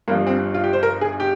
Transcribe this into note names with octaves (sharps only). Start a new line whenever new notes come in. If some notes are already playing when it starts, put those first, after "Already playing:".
G1 G2 F3 A#3
C4
F4
G4
C5
A#4
G#4
G4